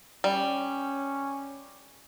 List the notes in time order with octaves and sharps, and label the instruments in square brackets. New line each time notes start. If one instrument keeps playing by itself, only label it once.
[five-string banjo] G3 [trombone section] C#4